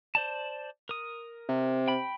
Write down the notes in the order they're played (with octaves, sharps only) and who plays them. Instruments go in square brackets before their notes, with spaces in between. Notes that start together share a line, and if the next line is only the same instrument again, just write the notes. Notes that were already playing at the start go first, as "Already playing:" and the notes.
[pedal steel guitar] C5 D5 A5
A#4 D#6
[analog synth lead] C3
[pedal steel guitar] G5 B5